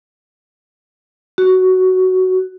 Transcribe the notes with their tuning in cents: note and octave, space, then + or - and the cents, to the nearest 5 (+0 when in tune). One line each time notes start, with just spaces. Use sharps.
F#4 +10